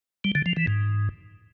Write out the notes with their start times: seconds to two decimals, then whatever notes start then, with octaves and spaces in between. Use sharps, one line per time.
0.24 G3
0.35 D3
0.46 F3
0.57 E3
0.67 G#2